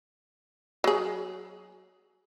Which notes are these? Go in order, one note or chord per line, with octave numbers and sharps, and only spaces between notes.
F#3 G#4